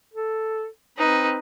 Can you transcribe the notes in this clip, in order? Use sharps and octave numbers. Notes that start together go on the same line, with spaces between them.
A4
C4 D#4 B4